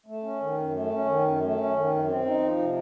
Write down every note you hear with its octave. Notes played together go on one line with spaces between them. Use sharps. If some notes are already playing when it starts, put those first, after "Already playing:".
A3
C#4
D#3
F#2
A3
C#4
D#3
F#2
A3
C#4
D#3
F#2
C4
D#4
F3
C3